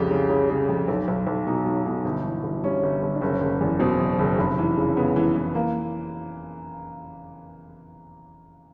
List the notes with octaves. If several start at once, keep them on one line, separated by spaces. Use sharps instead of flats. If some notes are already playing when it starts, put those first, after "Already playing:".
Already playing: C2 F2 C#3 G4
C#3
C#3
C#3
F2
B1
B1
B1
B2 D#4
F#3
B2
G1
E3
G1
G2 C#4
G1
G1
D4
F#1 C#4
F#1
E2
B2 C4
F#1
F#1
F1
E3
C#3
C#3 B3
E3
E3
A#3